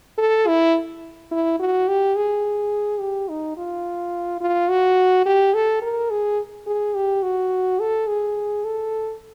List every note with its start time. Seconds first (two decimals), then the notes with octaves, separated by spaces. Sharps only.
0.18 A4
0.47 E4
1.31 E4
1.59 F#4
1.88 G4
2.16 G#4
3.00 G4
3.29 D#4
3.57 F4
4.41 F4
4.69 F#4
5.25 G4
5.54 A4
5.82 A#4
6.10 G#4
6.67 G#4
6.95 G4
7.23 F#4
7.80 A4
8.07 G#4
8.65 A4